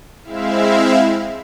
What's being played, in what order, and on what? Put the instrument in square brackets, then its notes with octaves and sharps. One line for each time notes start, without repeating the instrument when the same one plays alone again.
[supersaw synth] G#3 C4 E4 E5 F5